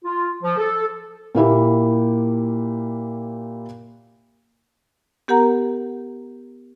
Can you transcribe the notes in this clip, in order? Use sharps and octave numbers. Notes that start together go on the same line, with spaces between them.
F4
F3
A4
A#2 A#3 E4 G4
B3 G4 A#4 F#5 A#5